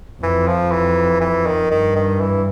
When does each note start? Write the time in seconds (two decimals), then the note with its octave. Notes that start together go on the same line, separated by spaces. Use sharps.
0.23 F2 E3
0.47 F3
0.71 E3
1.21 E3
1.46 D#3
1.71 G2 D#3
1.96 D#3
2.21 E3